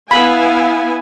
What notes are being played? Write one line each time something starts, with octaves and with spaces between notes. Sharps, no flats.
B3 E4 F5 G#5 B5